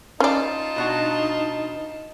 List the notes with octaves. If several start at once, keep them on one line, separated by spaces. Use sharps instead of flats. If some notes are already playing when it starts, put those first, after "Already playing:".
C#4 D#4 F4 D5 A5
B2 D4 F#4